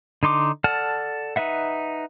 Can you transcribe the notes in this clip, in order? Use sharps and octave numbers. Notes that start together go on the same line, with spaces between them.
D3 D#4 C6 D6
A4 D5 F#5 A5 F6
D#4 B4 E5 F#5